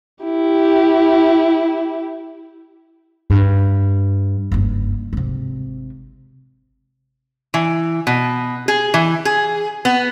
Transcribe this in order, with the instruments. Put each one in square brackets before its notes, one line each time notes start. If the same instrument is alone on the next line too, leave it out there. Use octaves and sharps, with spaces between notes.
[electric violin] E4 G4
[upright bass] G2
F#1 G2
G#1 C3
[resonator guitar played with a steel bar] E3
B2
G#4
E3
G#4
B3